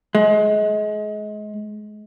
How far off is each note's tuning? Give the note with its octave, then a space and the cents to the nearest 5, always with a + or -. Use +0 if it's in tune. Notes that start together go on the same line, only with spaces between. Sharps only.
G#3 +30